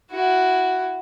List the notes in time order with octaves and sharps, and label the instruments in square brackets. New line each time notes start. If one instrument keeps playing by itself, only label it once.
[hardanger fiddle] E4 F#4